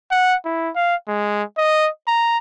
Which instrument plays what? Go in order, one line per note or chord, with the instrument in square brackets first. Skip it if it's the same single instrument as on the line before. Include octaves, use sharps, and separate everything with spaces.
[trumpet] F#5
E4
F5
G#3
D#5
A#5